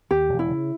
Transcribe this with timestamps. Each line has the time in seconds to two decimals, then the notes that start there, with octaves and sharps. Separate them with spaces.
0.11 D#2 G4
0.29 E1
0.39 E4
0.49 C#3